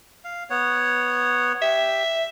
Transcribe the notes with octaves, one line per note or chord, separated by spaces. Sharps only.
F5
B3 C#5 F#5
G4 E5